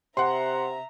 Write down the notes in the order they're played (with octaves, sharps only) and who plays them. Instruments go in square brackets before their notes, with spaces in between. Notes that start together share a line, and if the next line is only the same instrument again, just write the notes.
[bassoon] C3 [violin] E5 A#5 [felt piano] F#5 C6